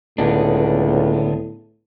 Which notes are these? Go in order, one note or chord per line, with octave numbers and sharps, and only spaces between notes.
C#2 A2 D3 B3 D4